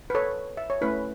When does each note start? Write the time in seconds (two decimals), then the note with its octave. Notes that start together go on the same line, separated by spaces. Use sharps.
0.10 B4
0.15 A4 C#5
0.57 E5
0.70 C#5
0.81 A3 C#4 E4 B4